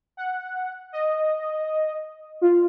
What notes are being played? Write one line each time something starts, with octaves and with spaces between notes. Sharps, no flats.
F#5
D#5
F4